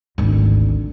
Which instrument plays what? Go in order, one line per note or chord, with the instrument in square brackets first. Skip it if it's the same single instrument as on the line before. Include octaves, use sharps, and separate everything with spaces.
[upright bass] G#1 D2